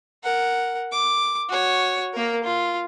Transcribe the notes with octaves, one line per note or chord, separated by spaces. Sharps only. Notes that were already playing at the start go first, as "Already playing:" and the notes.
A#4 F#5
D6
F#4 C#5
A#3 A#4
F4